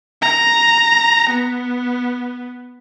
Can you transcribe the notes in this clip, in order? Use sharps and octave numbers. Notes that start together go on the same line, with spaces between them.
A#5
B3